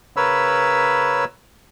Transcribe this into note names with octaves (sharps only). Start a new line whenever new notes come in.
C#3 A#4 B4 C#5 B5 E6